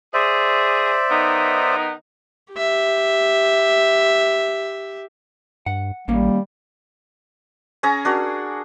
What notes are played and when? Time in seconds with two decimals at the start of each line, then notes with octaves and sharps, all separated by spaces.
0.14 G#4 C5 D5 E5
1.10 D#3 B3 D#4
2.53 G4 E5
5.66 G2 F#5
6.08 A1 D#2 G3 A#3 C#4
7.83 C#4 G#4 G#5 A#5
8.05 D4 F#4 A#4